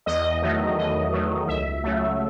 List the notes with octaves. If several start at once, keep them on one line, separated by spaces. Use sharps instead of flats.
E2 D#5
D#3 F#3 A3
E2 D#5
D#3 F#3 A3
C#2 E5
C#3 F#3 A3